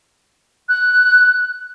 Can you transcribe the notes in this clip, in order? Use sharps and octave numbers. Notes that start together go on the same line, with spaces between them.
F#6